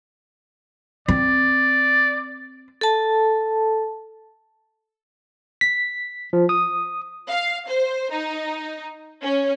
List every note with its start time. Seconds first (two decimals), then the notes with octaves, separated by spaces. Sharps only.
1.08 C4 D5
2.81 A4 A5
5.61 B6
6.33 F3
6.49 D#6
7.29 F5
7.69 C5
8.12 D#4
9.23 C#4